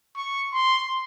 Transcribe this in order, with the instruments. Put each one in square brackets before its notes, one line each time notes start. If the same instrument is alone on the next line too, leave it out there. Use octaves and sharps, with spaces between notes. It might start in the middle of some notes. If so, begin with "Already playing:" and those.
[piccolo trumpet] C#6
C6